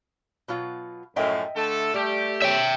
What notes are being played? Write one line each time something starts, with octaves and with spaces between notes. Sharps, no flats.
B2 F#3 F4
F#2 A2 F3 D#5 E5 G5
D3 A3 A4
G3 A3 G4
C#5 E5 G5